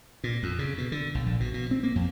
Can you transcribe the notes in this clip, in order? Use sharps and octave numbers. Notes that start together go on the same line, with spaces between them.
A#2
F2
C#3
B2
D3
B1
A#1
B2
B2
C4
A#3
F2